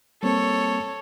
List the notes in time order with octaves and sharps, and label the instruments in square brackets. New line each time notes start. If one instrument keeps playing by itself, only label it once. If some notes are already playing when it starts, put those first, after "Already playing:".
[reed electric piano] G3 A#3 C4 [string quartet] A4 C#5